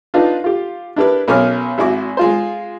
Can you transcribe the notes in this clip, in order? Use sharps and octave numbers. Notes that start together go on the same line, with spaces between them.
D4 D#4 F4 B4
F4 G4
D4 E4 G4 A#4 B4
B1 B2 C#4 A#4 D6 F6
G#1 E4 F#4 D6
G#3 F4 C5